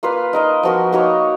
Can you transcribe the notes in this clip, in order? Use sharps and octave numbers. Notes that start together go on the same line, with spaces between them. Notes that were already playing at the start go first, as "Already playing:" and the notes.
A#3 F4 B4 F5
D#4 A#4 D#5
F3 B3 F#4 A#4
A#3 D#4 F#4 C#5